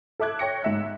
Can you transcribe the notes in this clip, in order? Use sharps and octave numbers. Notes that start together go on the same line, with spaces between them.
A4 E5 D6 F#6 G#6
C#5 G5 A#6 C#7
G#2 E5 F#6